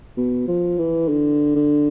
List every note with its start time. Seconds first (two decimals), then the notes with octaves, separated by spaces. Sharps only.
0.17 B2
0.48 F3
0.78 E3
1.09 D3
1.56 D3